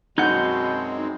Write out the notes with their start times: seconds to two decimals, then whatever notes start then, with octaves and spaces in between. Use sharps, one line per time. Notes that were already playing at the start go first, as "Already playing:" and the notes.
0.18 F#2 B2 G#3 C4 D#4 F#5 G6